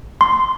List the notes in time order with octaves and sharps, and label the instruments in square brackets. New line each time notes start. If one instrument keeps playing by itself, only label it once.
[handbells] C6